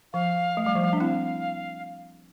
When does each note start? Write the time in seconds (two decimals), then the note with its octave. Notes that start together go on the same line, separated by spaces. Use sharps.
0.13 F3 F5
0.57 A3
0.66 G3
0.75 F3
0.83 G3
0.93 D4 E5
1.00 C4 E4 F5